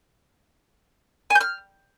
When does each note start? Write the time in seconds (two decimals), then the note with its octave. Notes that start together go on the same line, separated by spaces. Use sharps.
1.30 G#5
1.35 G6
1.41 F6